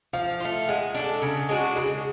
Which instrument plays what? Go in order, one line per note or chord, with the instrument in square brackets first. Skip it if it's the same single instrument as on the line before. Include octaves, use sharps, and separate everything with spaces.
[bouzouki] F3 [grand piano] F5
[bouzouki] A3 F4
[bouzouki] G#3 [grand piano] F#5
[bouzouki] D4 F#4 A4
C#3
G#3 D4 F#4
[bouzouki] C#3 [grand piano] G#4